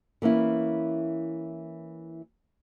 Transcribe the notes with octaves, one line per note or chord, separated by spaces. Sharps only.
E3 A#3 C#4 E4